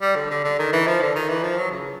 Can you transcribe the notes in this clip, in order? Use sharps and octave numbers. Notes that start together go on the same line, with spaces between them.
G3
D3
D3
D3
D#3
E3
F3
D3
D#3
E3
F3
F#3
C#3